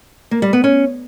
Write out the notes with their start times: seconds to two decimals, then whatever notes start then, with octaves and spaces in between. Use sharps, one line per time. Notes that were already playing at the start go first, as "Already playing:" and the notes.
0.31 A#3
0.42 G3
0.53 B3
0.64 C#4